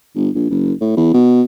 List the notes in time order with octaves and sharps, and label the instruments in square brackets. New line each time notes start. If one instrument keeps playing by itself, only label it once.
[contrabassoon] G1
A#1
F#1
A2
E2
B2